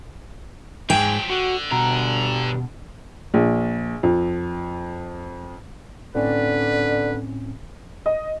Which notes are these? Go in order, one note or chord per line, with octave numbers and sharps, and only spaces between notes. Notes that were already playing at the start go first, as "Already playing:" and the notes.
G#2 F3 F#3 G#4 G5
D3 F#4
G2 B2 A#5
A#1
F2
A2 D3 C4 C#4 B4 D5
D#5